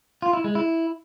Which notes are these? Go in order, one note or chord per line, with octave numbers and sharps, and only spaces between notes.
F4
E4
G#3
E4